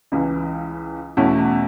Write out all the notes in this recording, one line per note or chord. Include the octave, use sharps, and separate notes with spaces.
C#2 C#3 E3
E2 B2 A3 C#4 E4